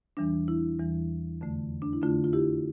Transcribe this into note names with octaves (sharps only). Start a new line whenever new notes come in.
E2 E3 G3 D4
E4
E2 E3 G3
F2 D3 A3
D4
E4
F2 D3 A3 D4 F4
F4
E4 G4